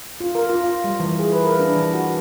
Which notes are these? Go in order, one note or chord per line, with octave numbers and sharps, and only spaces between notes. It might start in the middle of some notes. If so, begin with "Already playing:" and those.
F4
A#4
F4
F4
G3
E3
G#4
B4
A#4
D4
E3
F#4